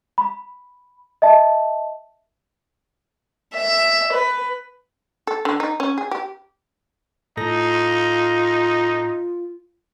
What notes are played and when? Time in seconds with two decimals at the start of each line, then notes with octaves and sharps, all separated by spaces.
0.18 B5
1.22 D#5 E5 A5
3.54 E5
4.12 B4
5.27 A4
5.45 D3
5.60 D#4
5.80 C#4
5.98 G#4
6.11 G4
7.37 A2 D#4 F4 A4 A#6